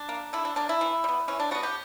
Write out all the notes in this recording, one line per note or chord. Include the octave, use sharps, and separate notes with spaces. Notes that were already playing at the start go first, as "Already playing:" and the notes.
Already playing: D4
A#3
D3 E4
D4
A#3 D4
E4
E3
G3
B3
E3 C#4
D4
G3 B3 F#4
G4